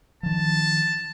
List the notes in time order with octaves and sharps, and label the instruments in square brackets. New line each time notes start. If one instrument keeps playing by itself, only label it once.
[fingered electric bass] D#3 F3 [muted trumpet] A5